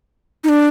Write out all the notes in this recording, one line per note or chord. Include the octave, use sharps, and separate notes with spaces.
D#4
D4